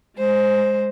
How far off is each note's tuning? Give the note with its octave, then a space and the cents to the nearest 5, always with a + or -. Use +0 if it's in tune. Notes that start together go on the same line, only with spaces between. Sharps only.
G#3 -5 C5 +0